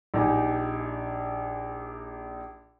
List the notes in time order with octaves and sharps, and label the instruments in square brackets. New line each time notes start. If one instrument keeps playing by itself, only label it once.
[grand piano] A#1 D#4 G4 G#5